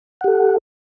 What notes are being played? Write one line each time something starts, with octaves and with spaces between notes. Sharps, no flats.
G4 A4 F#5